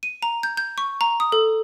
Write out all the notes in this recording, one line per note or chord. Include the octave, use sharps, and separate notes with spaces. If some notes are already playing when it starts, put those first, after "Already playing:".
D#7
A#5
G6
G6
C#6
A#5
D#6
A4